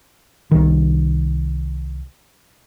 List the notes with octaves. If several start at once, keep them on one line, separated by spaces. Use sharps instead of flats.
C2 D#3